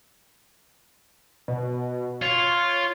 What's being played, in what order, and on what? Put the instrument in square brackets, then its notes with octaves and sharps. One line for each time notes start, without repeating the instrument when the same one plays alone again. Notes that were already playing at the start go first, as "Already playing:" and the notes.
[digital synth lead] B2
[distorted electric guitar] F4 [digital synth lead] C#5